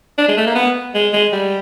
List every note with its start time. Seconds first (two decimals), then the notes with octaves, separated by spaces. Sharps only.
0.18 D4
0.28 G#3
0.37 A3
0.47 A#3
0.55 B3
0.94 G#3
1.13 G#3
1.32 G3